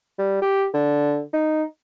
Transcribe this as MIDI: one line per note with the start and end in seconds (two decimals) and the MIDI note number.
0.19 0.38 55
0.42 0.66 67
0.73 1.21 50
1.34 1.63 63